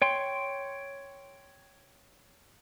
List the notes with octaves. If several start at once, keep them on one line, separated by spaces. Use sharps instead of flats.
C#5 G5 C6